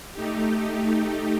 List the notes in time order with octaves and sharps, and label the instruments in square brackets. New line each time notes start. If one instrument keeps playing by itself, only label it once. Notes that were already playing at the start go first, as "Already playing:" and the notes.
[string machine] A3 D#4 G4